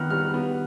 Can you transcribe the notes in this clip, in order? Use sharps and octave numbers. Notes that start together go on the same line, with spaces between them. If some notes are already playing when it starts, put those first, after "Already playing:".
Already playing: D#3 B3 D#4 F6 F#6
G3 F6
B3